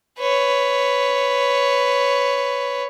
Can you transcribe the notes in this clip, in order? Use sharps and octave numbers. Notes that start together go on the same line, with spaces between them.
B4 C#5